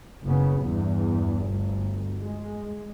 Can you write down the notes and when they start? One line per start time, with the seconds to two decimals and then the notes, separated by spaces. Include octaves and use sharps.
0.24 F#1 C#3 B3
0.62 E2 G2
1.46 G1 D2
2.21 G#3